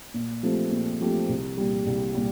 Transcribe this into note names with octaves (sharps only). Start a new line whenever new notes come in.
A#2
F3 A3 C4 G4
A#2
F3 A3 C4 G4
C2
A#2 G3
C2
A#2 G3